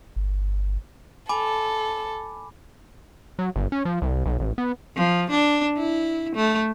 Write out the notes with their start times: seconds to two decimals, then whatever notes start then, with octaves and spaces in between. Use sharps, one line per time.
0.16 G1
1.29 A4 G#5 B5 D6
3.39 F#3
3.56 G1
3.72 C#4
3.85 F3
4.02 C2
4.26 B1
4.40 A1
4.58 B3
4.96 F3
5.31 D4
5.77 E4
6.36 A3